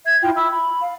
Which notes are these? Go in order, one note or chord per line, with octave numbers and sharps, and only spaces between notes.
E5 G#6
E4 F4 G5
E5 B5 E6
B5
F5